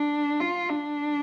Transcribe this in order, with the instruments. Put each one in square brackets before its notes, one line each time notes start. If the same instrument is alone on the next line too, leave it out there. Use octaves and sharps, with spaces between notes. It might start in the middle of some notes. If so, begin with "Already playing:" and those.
Already playing: [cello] D4
F4
D4